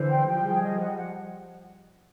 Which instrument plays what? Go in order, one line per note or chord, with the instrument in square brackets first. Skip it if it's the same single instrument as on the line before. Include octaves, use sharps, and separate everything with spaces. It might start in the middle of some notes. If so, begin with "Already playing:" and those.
Already playing: [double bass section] D3 E3 [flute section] C5
[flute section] G5
[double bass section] F3 G3 [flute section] G5
[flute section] G#4
D#5
F#5
F#5